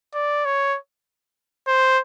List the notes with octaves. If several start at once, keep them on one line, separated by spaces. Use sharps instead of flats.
D5
C#5
C5